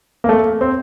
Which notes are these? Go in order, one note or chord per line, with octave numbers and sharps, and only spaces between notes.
A#3
A3
C4